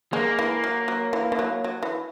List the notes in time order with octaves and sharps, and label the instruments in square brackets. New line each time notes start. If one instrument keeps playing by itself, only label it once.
[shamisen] G#3 [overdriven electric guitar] A#3
[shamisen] E3
F#3
F#3
E3
E3
F#3
F#3
E3